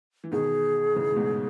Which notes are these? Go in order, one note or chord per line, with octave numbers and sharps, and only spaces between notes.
E3
B2 D#3 G#4
C#3 E3
A2
G#2 B2